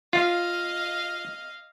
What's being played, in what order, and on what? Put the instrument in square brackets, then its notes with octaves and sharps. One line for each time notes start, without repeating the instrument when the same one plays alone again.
[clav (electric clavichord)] F4 [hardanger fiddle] D#5 F5